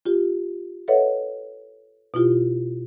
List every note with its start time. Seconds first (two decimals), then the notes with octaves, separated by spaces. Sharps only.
0.05 F4 G4
0.88 A4 B4 C#5 D#5 E5 F#5
2.14 B2 E4 F4 G4